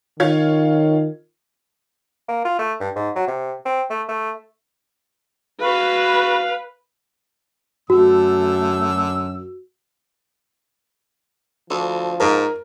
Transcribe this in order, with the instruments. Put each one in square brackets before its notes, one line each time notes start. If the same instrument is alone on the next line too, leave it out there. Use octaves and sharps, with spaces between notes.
[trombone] D#3 [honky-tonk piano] F4 C#5 G#6
[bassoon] A#3
F4
A3
G2
G#2
F#3
C3
C4
A3
A3
[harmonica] F#4 F5 [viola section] B4
[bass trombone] F#2 [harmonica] D3 E6 [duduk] A3 [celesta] F#4
[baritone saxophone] D2 [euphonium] F3
[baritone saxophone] G#2 [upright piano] A#4